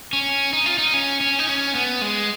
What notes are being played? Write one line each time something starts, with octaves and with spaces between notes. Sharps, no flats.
C#4
D#4
F4
D#4
C#4
C#4
D#4
C#4
B3
G#3